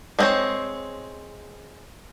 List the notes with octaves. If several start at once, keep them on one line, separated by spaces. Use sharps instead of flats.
G#3 B3 C4 C5 C#5